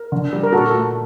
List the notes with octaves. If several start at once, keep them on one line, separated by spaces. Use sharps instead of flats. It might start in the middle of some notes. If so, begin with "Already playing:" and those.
Already playing: A#4
D3
G3
A#4
A#2 F#4 A4
A3